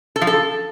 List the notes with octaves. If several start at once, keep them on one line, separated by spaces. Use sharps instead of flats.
A4
F3
A4